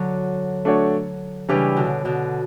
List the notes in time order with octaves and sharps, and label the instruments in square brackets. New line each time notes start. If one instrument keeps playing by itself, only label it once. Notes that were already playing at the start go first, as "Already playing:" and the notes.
Already playing: [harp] D3 F#3
[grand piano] A3 D4 F#4 C#5
[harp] C#3 E3 [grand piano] G3 D4 G4 B4
[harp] B2 D3
B2 D3